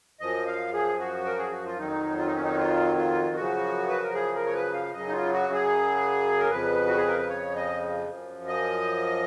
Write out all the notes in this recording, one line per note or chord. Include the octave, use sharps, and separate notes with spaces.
F#2 F3 D#5
F5
G#4
F#4
A#4
G#4
F#4
F4
F2 D#3 F#3 D#4
F4
D#4
C#4
D#4
F4
F4
F#2 C#3 F3 F#4
B4
A#4
G#4
A#4
C#5
B4
F5
F#2 C#3 F#3 D#5
D#4
F4
F#4
G#4
A#4
F2 C#3 F3 B4
F#4
G#4
A#4
B4
C#5
D#5
F#2 F3
D#5